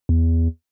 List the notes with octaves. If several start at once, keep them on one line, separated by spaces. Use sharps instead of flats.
E2